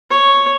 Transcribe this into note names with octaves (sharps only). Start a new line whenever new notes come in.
C#5